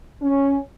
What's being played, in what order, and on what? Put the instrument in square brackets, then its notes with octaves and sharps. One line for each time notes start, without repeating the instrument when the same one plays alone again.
[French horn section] C#4